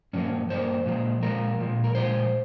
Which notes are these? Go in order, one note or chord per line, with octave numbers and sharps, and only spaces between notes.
G2 F3 A#3 C#4
G2 F3 A#3 C5
A#2 F3 G#3
A#2 F3 G#3 A#4
A#2 F3 G#3
A#4
A#2 F3 G#3 C5